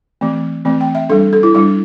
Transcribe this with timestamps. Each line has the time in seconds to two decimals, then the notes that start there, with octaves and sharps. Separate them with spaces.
0.21 E3 A3 C4
0.65 E3 A3 C4
0.81 G5
0.95 E5
1.10 G3 D4 A4
1.33 A4
1.43 E4
1.55 G3 D4 E4